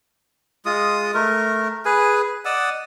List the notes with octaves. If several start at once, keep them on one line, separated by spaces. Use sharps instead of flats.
G#3 F4 D#6
A3 A#4
G#4 B4 G#5
D5 D#5 F#5 E6